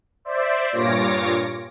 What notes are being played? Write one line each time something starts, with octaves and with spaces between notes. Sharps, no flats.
C5 D5 E5
G2 A#2 F4 C#5 D6 A#6